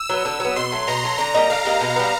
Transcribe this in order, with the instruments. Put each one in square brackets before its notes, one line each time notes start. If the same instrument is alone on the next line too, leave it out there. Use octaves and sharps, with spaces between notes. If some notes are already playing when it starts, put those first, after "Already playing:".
Already playing: [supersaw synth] E6
[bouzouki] F#3 B3
[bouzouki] D3 [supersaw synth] E6
[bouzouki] F#3 B3
[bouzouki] B2 [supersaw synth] C6
[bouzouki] F#3 A3
[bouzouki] B2 [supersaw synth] A#5
[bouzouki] F#3 A3
[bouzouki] D3 [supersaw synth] A#5
[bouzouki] G3 A#3 D#4
[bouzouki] D3 [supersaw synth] F5
[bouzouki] G3 A#3 D#4
B2
G3 B3